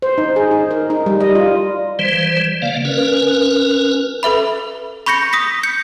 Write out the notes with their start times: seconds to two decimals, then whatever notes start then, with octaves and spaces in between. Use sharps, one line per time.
0.02 C5
0.18 D#4
0.36 G#4
0.51 D#4
0.71 A#4
0.90 D#4
1.06 G3
1.21 D#5
1.35 F4
1.99 E3 G3 C5
2.62 C#3 A#3 D5 F5
2.85 C#4 A#4 B4
4.23 A4 B4 E5 B5
5.06 B5 C#6 G6 A#6 C#7
5.33 D#6 A#6 B6
5.63 G6 C#7